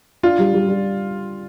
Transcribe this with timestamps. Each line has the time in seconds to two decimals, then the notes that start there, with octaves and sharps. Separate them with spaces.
0.23 D4 F4
0.39 G3
0.54 G3
0.68 G3